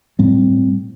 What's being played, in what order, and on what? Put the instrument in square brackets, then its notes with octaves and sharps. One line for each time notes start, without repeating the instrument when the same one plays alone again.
[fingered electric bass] A2 G3 C4